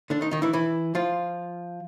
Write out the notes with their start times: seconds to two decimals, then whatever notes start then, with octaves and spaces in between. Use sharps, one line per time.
0.10 D3 D4
0.21 D#3 D#4
0.31 D#3 D#4
0.42 E3 E4
0.53 E3 E4
0.95 F3 F4